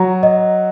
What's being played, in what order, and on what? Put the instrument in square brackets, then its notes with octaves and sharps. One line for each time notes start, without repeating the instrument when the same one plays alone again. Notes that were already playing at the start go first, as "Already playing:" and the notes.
Already playing: [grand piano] F#3 F#4 [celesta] A#5
[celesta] D#5